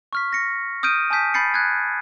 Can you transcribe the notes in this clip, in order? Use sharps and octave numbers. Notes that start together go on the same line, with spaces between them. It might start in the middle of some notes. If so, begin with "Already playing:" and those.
C#6 F6 B6
A#6 C#7
D#6 F6 G6 D7 D#7
G#5 A5 D#6 G6 B6
B5 G6 A6 C7 C#7
F#6 G#6